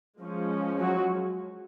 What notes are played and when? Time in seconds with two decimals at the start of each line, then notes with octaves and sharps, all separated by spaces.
0.19 F3 G#3 C#4
0.80 F#3 F#4